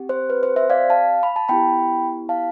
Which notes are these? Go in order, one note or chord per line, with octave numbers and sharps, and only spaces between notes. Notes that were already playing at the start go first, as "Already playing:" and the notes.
Already playing: C4 G4
C5
B4
C5
C5 E5
D5 F5
F5 A5
B5
A5
B3 E4 G4 G5 B5
F5 A5